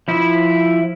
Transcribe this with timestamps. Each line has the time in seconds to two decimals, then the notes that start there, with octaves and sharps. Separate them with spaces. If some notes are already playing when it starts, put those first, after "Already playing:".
0.08 F3 E4